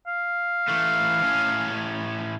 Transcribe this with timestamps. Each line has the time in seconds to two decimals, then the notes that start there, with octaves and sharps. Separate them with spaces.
0.07 F5
0.68 E3 A3
1.22 A2 C#4